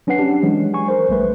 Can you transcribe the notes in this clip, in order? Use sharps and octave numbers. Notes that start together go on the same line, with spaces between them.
F#3 C#4 D4 B4 F#5 C7
D4 G4
E3 F#3 G#3
G#5 C#6
A#4 C5
A#1 G3 A3 B4